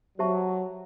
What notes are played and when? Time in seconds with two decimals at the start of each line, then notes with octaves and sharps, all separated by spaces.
0.18 F#3 G4 C5 E5 A5 C#6